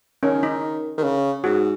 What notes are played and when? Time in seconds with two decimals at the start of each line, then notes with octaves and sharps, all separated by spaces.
0.23 D#3 C#4
0.43 D#4
0.98 D#3
1.04 C#3
1.44 G#2 F#4